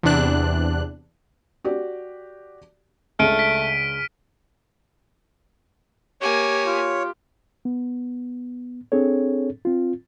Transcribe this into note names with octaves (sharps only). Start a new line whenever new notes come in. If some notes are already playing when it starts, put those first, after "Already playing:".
E2 C3 D4 F#6
F#4 G4 D5
C#2 C#3 A3 D4 F6 D7 D#7
B6
A#3 G4 C#5 G#5
F4
B3
C4 D4 G#4 A4 C#5
C4 F4